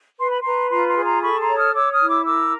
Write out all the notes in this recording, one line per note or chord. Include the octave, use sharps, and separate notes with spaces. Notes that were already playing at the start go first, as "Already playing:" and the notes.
B4 C6
B5
B4 A#5 C6
F4 A#5 C6
A#5 C6
G#4
A#5 C6
A4 B5 C#6
A#5 C6
C#5
D#6 F6
C#5 D6 E6
D#6 F6
E4
D6 E6
A#4 D6 E6